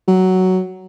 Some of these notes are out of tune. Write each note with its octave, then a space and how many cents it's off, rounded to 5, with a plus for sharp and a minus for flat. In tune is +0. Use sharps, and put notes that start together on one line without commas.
F#3 +10